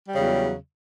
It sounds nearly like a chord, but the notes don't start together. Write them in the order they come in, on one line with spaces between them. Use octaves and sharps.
G3 C#3 E2 F#3